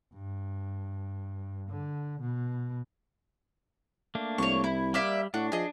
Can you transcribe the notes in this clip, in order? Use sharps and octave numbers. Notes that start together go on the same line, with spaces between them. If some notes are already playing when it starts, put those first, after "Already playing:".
G2
D3
B2
A3 A#3 D4
C2 C#5 C#6
E4
G3 A#3 D5 E5
A2 D4 F#4
F3 G#4 D#5